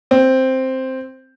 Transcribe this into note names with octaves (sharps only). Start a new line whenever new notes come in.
C4